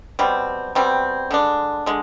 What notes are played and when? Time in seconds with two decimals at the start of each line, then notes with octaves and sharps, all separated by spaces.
0.19 B2 G3 C4
0.75 B2 G3 C4
1.31 D3 G#3 D4
1.86 D3 G#3